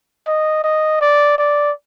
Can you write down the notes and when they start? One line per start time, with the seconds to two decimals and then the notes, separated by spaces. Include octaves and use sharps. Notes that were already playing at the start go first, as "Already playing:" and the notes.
0.27 D#5
0.64 D#5
1.01 D5
1.38 D5